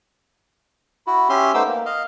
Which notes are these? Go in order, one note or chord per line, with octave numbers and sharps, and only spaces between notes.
E4 F#4
C#4 G4 E5 C6
A3 B3 D#4 C5 D6 E6
A#3
D#5 F5